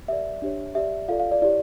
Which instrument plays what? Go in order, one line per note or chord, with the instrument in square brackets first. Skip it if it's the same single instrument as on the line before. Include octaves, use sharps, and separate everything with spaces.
[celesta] G4 A#4 D5 E5
D4 G4 C#5
G4 D5 E5
F4 A4 D5 F5
F5
D5
E4 G4 C#5 D5